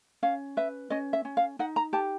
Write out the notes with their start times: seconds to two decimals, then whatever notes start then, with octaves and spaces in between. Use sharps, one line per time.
0.23 C#4 F5
0.57 B4 E5
0.90 C#4 D#5
1.13 E5
1.25 C#4
1.37 F5
1.59 D#4 F#5
1.76 A#5
1.93 G4 A5